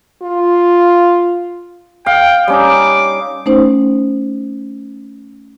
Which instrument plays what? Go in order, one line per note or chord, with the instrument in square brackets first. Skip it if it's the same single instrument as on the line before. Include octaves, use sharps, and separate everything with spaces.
[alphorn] F4
[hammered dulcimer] F5 [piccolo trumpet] G5
[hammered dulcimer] G3 C#4 D#4 [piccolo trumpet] D6
[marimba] A3 C#4 D#4 C5